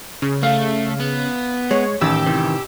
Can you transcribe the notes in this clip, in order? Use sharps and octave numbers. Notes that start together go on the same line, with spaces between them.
C#3
A3 F5
B3
G#3 C#5
A1 D#2 D#3 G4 E6
C3 D#3 E3